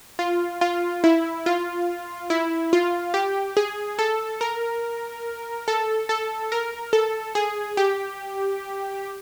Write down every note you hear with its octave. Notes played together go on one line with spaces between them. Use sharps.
F4
F4
E4
F4
E4
F4
G4
G#4
A4
A#4
A4
A4
A#4
A4
G#4
G4